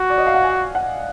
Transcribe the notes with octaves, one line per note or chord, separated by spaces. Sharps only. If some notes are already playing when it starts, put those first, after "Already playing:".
Already playing: F#4
D5
D#5
F5
F#5
G#5
F#5